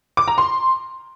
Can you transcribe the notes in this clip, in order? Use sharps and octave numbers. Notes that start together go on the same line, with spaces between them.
D6
A#5
C6